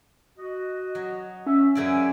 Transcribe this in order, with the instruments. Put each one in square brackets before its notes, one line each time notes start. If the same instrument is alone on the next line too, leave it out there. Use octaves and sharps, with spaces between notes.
[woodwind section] F#4 D#5
[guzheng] F#3
[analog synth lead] C#4 [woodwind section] E5
[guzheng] F#2 C#3 D5 [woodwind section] E5 G#5